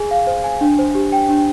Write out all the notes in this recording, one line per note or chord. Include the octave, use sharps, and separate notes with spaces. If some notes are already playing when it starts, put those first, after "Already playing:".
Already playing: G#4 G#5
F5
C5
G#5
D4
C5
G4
G5
D4